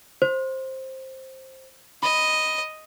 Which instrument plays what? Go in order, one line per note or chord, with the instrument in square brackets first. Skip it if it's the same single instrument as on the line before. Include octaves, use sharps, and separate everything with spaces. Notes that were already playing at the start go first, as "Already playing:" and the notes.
[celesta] C5
[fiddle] D#5 [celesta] B5